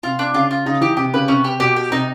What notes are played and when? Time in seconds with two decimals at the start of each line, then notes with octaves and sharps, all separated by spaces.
0.03 C3 F4
0.19 D4
0.34 C#3 F4
0.51 F4
0.66 C#3 D#4
0.81 E3 G4
0.97 C3 G4
1.14 C#3 B4
1.28 C3 C#4
1.44 G4
1.60 B2 G4
1.76 G4
1.91 C3 D#4